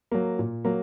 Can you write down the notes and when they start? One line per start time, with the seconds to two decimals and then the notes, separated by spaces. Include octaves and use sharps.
0.12 F#3 A#3
0.39 A#2
0.65 F#3 A#3